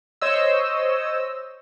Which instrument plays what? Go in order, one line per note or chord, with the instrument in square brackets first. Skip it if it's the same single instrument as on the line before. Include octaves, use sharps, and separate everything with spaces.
[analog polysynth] C5 C#5 D#5 E6